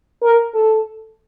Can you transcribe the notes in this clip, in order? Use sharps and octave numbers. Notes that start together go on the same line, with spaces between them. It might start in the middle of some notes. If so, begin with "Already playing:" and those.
A#4
A4